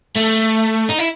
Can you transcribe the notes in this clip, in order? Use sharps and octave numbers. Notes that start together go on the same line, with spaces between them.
A3
D#4
E4